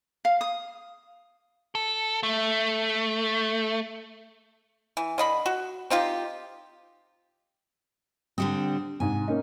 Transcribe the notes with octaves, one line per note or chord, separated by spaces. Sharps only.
F5
D#6
A4
A3
E3
D3 D#5 B5
F#4
C4 D#4 F4 G4
D3 G3 C4 D#6
G#2 C3 G#5
A#3 C#4 D#4